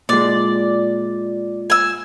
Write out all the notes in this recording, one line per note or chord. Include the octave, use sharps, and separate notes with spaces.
A#2 G#3 D5
G#5 E6